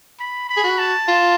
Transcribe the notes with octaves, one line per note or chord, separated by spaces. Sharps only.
B5
B5
G#4
F#4
A5
F4